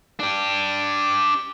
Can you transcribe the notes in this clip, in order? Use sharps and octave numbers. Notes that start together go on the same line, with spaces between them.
D4 G4